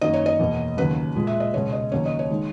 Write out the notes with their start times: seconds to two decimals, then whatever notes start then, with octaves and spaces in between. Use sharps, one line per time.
0.01 F#2 D#3 F#3 A#3 D#5
0.14 C#5
0.26 D#5
0.39 E2 B2 A#3
0.77 D#2 C#3 F#3 A#3 B4
1.15 A#2 G#3
1.27 E5
1.40 D#5
1.54 C#2 B2 G#3 C#5
1.73 D#5
1.92 D#2 C#3 F#3 A#3 C#5
2.06 D#5
2.19 C#5
2.30 D#3 G#3